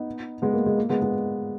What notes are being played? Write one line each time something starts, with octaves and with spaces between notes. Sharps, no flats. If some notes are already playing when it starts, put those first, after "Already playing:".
Already playing: B3 D#4
G#3 B3
A#3
G#3
A#3
G#3 B3
G#3 B3